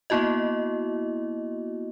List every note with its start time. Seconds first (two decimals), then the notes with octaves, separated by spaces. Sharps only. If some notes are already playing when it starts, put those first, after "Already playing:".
0.10 A#3 B3 E4 F#4 D#5